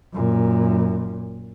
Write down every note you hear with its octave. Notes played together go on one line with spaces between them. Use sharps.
F#2 A#2